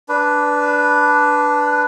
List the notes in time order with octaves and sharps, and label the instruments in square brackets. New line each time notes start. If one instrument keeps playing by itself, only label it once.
[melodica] D4 B4